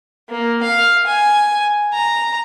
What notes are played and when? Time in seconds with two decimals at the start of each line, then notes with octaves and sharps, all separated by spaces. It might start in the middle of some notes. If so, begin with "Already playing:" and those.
0.29 A#3
0.63 F5
1.07 G#5
1.94 A#5